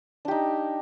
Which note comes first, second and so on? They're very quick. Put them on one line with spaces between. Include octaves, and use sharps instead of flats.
D4 G4 D#4